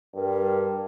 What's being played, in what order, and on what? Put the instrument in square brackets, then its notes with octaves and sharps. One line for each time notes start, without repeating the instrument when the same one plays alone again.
[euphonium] G2 [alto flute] A#4